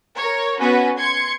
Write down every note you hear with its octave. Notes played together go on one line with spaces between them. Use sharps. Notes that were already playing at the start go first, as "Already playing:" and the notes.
A#4 C#5
B3 C#4 F#4 B4
C6 G#6 C#7